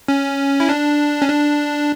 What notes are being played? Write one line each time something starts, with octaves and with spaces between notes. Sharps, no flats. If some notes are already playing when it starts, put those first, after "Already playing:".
C#4
E4
D4
C#4
D4